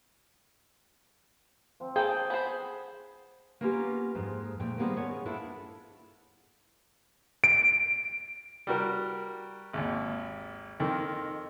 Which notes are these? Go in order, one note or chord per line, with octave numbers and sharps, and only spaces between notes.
F3 C4
A#3 G#4 A4 G5
B3 C5
A#3 B3 C#4 F4 G4 A#4
F2 G#2 G#3
F2 A#2 A3 G5
D#3 G3 A#3 B3 G#4 C5
B3 C#4 F4 A#4 C#5
D4 E4 F4 A4
D7
G3 F#4 A#4
G#1 D#2
F2 D#3